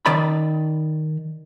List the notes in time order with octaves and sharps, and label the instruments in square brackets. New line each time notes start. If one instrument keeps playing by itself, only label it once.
[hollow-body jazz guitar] D#3 D5 B5